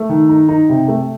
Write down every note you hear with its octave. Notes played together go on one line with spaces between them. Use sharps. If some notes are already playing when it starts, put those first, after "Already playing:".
Already playing: A3
D#3
D#4
D#4
C3
A3